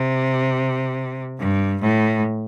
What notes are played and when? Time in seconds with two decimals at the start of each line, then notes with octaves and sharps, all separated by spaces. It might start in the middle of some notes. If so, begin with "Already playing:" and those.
Already playing: C3
1.39 G2
1.82 A2